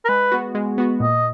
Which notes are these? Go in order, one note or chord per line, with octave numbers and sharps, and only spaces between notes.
A#4
G#3 B4
B3 F#4
G#3
B3 F#4
A#2 D#5